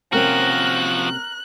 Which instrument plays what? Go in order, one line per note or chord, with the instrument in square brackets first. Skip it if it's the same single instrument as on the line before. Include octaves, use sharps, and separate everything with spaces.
[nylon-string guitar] C3 A#3 C#4 [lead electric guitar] F3 F#4 [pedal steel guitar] A#4 [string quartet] F#6